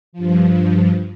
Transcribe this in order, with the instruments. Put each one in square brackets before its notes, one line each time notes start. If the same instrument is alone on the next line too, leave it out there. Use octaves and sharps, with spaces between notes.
[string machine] G2 F3